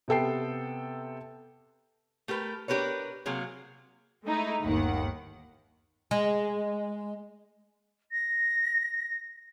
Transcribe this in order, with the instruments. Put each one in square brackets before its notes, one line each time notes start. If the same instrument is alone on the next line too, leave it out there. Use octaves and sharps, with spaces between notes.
[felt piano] C3 B3 A4 G5 C7
[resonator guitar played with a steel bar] A3 G4 A#4 B4
D4 G4 A#4 B4 C#5
C3 F#3 A#3 G#4
[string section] G#3 A3 D#4 E4
G1 D#2 D#3 F#5
[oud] G#3
[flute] A#6